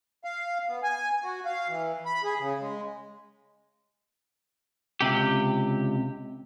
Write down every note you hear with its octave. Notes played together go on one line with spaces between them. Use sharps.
F5
B3
G#5
F#4
F5
E3
B5
G#4
C#3
G#3
C#2 C3 G4